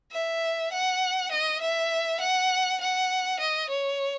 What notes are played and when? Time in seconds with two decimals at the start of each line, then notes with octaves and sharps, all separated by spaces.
0.12 E5
0.72 F#5
1.31 D#5
1.61 E5
2.20 F#5
2.81 F#5
3.40 D#5
3.69 C#5